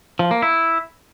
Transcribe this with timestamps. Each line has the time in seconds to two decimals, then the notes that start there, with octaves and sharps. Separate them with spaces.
0.19 F3
0.31 A#3
0.42 E4